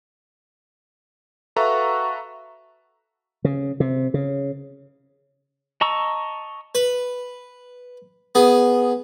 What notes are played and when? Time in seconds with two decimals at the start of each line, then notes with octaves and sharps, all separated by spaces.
1.56 F#4 A4 B4 E5 F5 A#5
3.45 C#3
3.80 C3
4.14 C#3
5.81 D#5 A5 A#5 C#6 E6
6.75 B4
8.35 B3 G#4